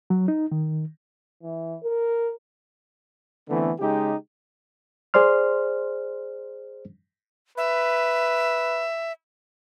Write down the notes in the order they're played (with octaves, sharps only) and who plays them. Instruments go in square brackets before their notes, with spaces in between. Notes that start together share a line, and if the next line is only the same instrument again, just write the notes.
[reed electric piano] F#3
D#4
D#3
[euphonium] E3
A#4
[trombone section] D3 E3 A3 B3 C4
C#3 G#3 D#4 G4
[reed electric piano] G#4 C5 D5 C6 F6
[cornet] B4 [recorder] E5